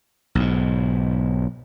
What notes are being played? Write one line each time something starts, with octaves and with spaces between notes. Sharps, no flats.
B1 G#2